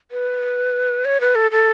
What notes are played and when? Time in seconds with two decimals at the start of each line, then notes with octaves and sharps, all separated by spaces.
0.11 B4
1.05 C#5
1.21 B4
1.35 A4
1.51 A4